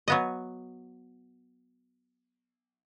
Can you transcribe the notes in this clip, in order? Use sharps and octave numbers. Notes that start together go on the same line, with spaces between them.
F#3 B3 D#5